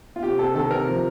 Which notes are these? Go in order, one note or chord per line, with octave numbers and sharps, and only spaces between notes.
F4
C3 G4
C3 A4
D#3 A4
C3 A#4
F3